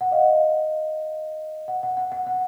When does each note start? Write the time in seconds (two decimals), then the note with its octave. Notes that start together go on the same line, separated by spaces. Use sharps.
0.01 F#5
0.11 D#5 F5
1.68 F#5
1.83 F#5
1.97 F#5
2.12 F#5
2.27 F#5